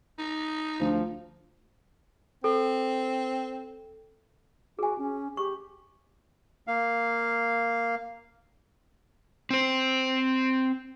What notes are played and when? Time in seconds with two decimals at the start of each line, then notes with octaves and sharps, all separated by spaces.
0.19 D#4
0.81 D2 F3
2.44 C4 A4
4.79 F#4 G#4 G#5
4.98 C#4
5.37 G4 C#6
6.67 A#3 F5
9.51 C4 C5